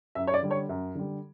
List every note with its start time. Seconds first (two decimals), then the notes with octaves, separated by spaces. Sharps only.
0.15 F#2 E5
0.27 C#5
0.34 D5
0.43 D3 G3
0.51 C#5
0.69 F#2
0.95 D3 G3